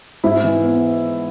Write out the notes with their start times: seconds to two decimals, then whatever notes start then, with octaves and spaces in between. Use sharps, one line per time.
0.24 G#2 E4
0.44 E3
0.63 B3